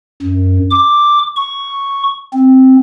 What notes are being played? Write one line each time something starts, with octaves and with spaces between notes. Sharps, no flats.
F#2
D6
C#6
C4